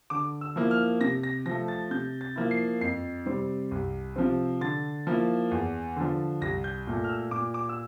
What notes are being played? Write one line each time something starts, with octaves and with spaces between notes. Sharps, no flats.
D3 D6
E6
F3 A#3 E4
F6
C3 A#6
A#6
F3 A3 A#6
A6
C3 G6
A6
F3 A#3 E4
C7
F2 C7
C3 G3 C4
C2
C3 F3 C4
D3 A6
F3 A#3 E4
E2
D3 F3
C2 A#6
G6
A#2 A3
F6
E6
A#2 D6
D6
E6